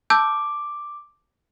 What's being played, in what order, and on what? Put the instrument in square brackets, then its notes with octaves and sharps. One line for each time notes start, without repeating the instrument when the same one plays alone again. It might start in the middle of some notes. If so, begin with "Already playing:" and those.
[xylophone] A5 E6 G6 [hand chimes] D6